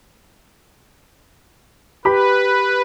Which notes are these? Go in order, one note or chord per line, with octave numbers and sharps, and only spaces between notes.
G4 B4 B5